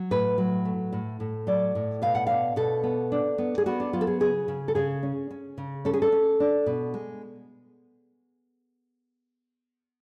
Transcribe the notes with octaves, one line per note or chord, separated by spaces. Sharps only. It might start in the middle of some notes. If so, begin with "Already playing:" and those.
Already playing: F#3
A2 B4
F#3
A3
A2
A2
F#3 D5
A2
B2 F5
F#5
D4 F5
B2 A4
B3
D4
B3
G#4
B3 F#4
D4
F#3 F4
A4
G#4
C#3 G#4
C#3
A4
C#3 G#4
C#4
C#4
C#3
C#4 A4
G#4
A4
C#4
D4
B2
G#3